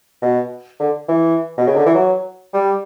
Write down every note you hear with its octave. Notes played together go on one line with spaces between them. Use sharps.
B2
D3
E3
B2
C#3
D3
E3
F#3
G3